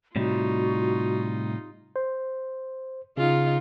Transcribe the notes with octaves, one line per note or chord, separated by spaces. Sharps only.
A2 C3 G3 D#4 F4 F#4
C5
C#3 D#4 F4